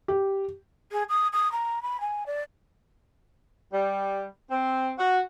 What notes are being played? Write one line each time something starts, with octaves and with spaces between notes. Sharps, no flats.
G4
G#4
D#6
D#6
A#5
B5
G#5
D5
G3
C4
F#4